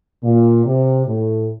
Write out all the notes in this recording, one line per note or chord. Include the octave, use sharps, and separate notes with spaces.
A#2
C3
A2